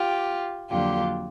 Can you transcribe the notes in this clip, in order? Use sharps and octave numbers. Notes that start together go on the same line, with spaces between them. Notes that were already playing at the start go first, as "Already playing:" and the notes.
Already playing: F4 G4
F2 D3 F#3 A#3 F4 G4